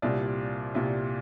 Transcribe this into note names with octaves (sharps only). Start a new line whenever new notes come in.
C2 A#2 G3 D5
C2 A#2 G3